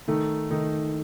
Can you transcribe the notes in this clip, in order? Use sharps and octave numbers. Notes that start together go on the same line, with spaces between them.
D#3 A3 D#4
D#3 A3 D#4